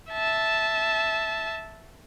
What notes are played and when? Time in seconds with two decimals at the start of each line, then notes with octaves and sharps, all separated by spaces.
0.11 E5 A5